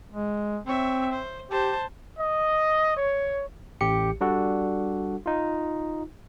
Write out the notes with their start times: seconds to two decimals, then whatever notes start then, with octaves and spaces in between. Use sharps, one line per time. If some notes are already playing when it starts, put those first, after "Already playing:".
0.12 G#3
0.67 C4 C#5 E5
1.11 C5
1.51 G4 C5 A5
2.18 D#5
2.97 C#5
3.81 A1 G4 C#7
4.21 G3 D4 F#4 A4 F#5
5.26 D#4 F4